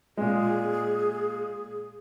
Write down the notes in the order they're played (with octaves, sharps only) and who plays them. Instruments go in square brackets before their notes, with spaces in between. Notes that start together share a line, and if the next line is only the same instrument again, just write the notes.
[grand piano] A#2 G#3 [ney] G#4